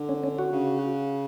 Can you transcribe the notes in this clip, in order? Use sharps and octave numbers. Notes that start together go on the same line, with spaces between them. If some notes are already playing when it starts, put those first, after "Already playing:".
Already playing: D3
C#4
C#4
F#4
C#3